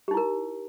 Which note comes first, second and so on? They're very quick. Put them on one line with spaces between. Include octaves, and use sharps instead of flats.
G4 D#4 E4 A#4